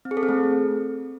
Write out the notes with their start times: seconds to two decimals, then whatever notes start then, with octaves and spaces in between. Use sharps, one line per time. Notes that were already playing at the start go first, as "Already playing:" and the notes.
0.05 C4
0.11 G#4
0.17 A4
0.23 C4
0.29 A3